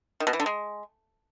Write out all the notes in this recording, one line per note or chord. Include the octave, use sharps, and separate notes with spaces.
D#3
B2
E3
D3
G#3